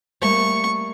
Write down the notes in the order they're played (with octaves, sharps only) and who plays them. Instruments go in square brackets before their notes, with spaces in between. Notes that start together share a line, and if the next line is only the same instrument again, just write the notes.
[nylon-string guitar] G3 A3 A#3 [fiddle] C#6